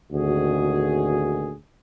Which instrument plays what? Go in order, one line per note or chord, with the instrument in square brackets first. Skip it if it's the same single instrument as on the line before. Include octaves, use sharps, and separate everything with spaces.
[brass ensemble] G#1 D2 A#2 D#3 F#4 G#4